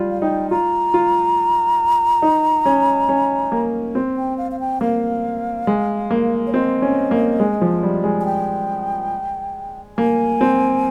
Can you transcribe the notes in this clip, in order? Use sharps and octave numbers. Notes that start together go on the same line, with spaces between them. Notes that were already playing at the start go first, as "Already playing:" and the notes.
Already playing: G3 F4
F5
D#4 G5
F4 A#5
F4
D#4
C#4
C#4
A#3
C4
G5
F5
F5
G5
A#3 F5
G#3
A#3
C#5
C4 D#5
C#4
A#3
G#3
F3
G3
G#3
G#5
G5
A#3 G#5
C4